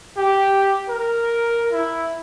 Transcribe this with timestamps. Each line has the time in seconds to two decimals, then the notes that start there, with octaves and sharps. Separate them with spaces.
0.17 G4
0.89 A#4
1.72 E4